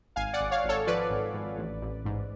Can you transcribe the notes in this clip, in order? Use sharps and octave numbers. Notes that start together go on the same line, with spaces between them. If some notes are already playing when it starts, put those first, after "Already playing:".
G#1 F5 G#5
D5 F#5
G#1
C#5 F5
G#1 A4 C#5
F3 B4 D5
G#1
G#1
A1
A1
G#2